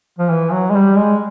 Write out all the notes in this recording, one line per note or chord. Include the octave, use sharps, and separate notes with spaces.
F3
E3
F#3
G#3
G3
G#3